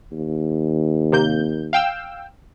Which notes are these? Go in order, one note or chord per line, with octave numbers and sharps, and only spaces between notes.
D#2
C3 A#3 G6
F5 G5 E6